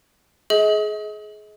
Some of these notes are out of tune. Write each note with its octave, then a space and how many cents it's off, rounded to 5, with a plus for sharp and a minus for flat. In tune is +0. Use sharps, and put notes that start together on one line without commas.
G#4 +25 D#5 +35